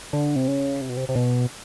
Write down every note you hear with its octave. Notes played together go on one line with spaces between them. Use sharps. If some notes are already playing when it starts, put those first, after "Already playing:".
D3
C3
C#3
C3
B2
C3
C3
B2